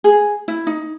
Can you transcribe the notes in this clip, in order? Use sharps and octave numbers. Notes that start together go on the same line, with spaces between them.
G#4
E4
D#4